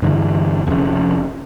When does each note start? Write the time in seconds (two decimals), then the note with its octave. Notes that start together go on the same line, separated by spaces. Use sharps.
0.02 G2 D3 E3
0.67 F1 F2 A#2 C#3